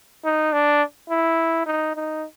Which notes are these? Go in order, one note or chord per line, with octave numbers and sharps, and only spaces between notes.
D#4
D4
E4
D#4
D#4